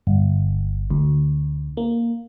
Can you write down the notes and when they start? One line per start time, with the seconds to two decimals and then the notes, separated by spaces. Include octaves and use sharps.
0.07 G1
0.90 D2
1.77 A#3